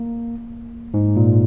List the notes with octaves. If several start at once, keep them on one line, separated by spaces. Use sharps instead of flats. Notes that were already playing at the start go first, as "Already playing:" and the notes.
Already playing: A#3
G#2
A#2